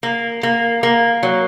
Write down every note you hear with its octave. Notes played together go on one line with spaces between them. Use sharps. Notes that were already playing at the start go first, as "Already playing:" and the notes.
A#3
A#3
A#3
F#3